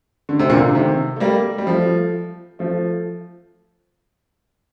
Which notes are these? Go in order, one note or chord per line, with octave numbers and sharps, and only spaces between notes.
D3
C3
A#2 D3
C3 D#3
A3
G3 A#3
G3
F3 A3
F3 A3